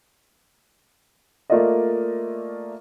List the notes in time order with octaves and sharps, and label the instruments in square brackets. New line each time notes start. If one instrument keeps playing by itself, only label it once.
[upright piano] A3 A#3 F4 A#4 D5 D#5